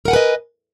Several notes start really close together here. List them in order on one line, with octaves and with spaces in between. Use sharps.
A#4 F#5 G#5 B4 D#5